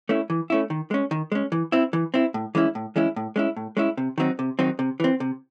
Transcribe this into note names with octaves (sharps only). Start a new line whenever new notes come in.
A3 C#4 E4
E3
A3 C#4 E4
D#3
G#3 C#4
D#3
G#3 C#4
E3
C4 E4
E3
C4 E4
A2
E3 G#3 C#4 E4
A2
E3 G#3 C#4 E4
A2
G#3 C#4 E4
A2
G#3 C#4 E4
C3
D#3 F#3 C4 D#4
C3
D#3 F#3 C4 D#4
C3
E3 C4
C3